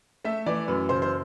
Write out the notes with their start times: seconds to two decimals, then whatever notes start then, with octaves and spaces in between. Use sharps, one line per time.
0.25 A3 E5
0.46 E3 D5
0.68 F#2 B4
0.89 F#1 C5
1.02 C5